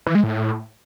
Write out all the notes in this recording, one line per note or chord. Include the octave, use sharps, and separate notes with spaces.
E3
G#3
A2